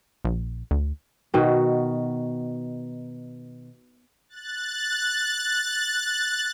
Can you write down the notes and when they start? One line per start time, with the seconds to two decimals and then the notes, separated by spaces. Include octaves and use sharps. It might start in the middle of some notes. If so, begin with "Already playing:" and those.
0.25 A#1
0.71 D2
1.34 B2 D#3 F#4
4.29 F#6 A6